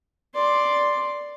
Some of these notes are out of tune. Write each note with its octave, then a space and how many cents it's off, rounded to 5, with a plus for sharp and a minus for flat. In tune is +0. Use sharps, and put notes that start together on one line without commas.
D5 +0 C6 +0